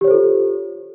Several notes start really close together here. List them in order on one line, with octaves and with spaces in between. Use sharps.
G4 C#5 C5 A4 F4